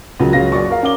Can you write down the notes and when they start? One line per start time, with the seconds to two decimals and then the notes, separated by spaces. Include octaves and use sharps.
0.20 C#2 C#3 F3 F#3 A#4
0.33 C#2 F#3 C#4 G#4 F5 A#6
0.52 F#1 F#2 D5 C#6
0.70 A#4 F5
0.82 C#4 A#4 F5 D6 G7